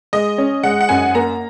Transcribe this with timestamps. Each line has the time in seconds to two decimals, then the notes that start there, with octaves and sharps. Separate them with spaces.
0.13 G#3 D#5
0.38 C#4
0.63 G#3 F#5
0.81 F#5
0.89 F#2 G#5
1.15 A#3 A#5